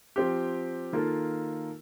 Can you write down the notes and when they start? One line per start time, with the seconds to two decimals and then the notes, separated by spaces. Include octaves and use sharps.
0.16 F3 C4 G4
0.93 D#3 A#3 F4 A4